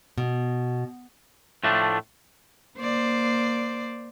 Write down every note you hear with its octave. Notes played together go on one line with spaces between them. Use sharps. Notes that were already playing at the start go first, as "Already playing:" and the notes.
B2
A2 F3 A3 D4
A#3 C5 D5